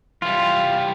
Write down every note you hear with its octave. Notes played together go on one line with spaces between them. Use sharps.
E3 G3 F4